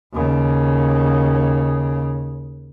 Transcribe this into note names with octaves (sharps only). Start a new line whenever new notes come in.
D#2 C#3